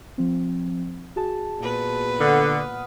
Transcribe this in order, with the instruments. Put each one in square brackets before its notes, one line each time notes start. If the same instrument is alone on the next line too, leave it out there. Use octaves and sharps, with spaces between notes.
[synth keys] F3 C4
F#4 G#4 A5
[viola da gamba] A#2 B3 B4
[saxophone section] D3 [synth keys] F#5 D#6 F6